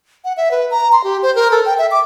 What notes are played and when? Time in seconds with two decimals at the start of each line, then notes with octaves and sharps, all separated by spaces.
0.24 F#5
0.37 E5
0.51 B4
0.71 A#5
0.92 C6
1.04 G4
1.23 C5
1.35 A#4
1.51 A4
1.65 G5
1.78 E5
1.91 D6